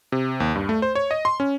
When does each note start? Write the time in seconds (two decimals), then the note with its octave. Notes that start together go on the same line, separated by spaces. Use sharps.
0.12 C3
0.40 D#2
0.55 G2
0.69 A3
0.82 C5
0.95 C#5
1.11 D#5
1.25 C6
1.40 C#4